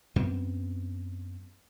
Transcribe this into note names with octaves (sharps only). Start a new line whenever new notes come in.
F#2 B3 C4